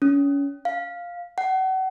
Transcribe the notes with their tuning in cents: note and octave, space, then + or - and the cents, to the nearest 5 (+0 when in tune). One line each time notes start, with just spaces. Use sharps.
C#4 +30
F5 +5
F#5 +35